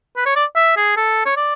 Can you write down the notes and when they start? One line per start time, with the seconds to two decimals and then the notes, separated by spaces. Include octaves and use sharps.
0.17 B4
0.26 C#5
0.36 D5
0.56 E5
0.77 G#4
0.97 A4
1.26 C#5
1.37 D5